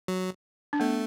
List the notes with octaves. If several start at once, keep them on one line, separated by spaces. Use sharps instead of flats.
F#3
D4
A3 B3